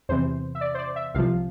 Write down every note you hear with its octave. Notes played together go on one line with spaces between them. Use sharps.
E2 C3 E3 C5
E5
D5
C5
D5
E5
C2 C3 F3 F5